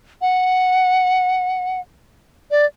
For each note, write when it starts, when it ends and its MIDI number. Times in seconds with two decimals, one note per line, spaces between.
0.21 1.80 78
2.51 2.66 74